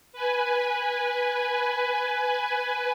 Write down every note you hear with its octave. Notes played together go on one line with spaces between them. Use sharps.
B4 G#5